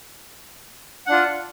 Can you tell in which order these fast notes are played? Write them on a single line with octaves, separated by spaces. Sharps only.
F#5 D4 F4